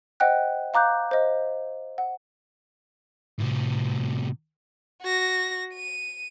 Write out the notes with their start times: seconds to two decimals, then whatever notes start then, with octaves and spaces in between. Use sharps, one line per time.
0.20 C5 D#5 F#5 G5 F#6
0.74 F5 A#5 D6 F#6 G6
1.11 C5 D#5
1.98 F#5
3.39 A2 C3
5.02 F#4 A#6
5.74 D#7